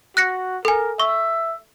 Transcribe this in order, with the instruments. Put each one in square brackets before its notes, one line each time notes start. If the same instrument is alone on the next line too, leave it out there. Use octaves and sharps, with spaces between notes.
[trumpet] F#4 [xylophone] F#6 A#6 C#7
[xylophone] A4 G#5 [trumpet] A#4
[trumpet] E5 [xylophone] C#6